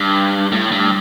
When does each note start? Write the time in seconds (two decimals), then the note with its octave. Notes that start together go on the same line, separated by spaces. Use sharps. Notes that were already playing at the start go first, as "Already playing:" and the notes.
Already playing: G2
0.52 A2
0.72 G2